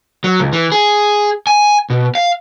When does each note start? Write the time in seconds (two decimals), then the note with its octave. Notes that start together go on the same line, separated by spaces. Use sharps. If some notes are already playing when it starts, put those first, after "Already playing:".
0.24 F#3
0.40 C#2
0.53 E3
0.72 G#4
1.47 G#5
1.90 B2
2.15 F5